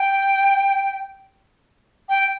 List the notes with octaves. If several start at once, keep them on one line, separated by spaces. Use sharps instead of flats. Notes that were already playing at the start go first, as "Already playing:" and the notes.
Already playing: G5
G5